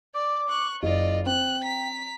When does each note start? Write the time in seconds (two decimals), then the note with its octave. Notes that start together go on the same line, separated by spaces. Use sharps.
0.15 D5 D6
0.49 C#6 F#6
0.83 F#1 F4 D5 D#5
1.26 C4 G5 F#6
1.63 A#5 B6